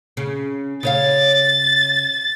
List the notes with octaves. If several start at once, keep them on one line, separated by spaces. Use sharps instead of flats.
C#3
C#3 C#5 F5 A6